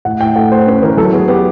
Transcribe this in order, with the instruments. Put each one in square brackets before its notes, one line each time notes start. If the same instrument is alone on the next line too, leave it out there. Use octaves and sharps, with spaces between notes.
[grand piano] A2 F#5
A2 G5
A3 F#5
A3 C5
C#4 B4
E3 A#4
F#3 A4
B3 G#4
B3 G4